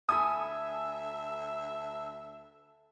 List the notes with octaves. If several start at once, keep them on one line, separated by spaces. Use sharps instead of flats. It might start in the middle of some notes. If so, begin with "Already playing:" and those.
D2 A4 E5 G#5 B5 D#6